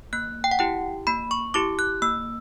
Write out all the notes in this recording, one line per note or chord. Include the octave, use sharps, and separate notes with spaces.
A#3 F#6
G5
F#5
E4 G4 G5
A#3 B5
C#6
E4 G4 D6
F#6
A#3 E6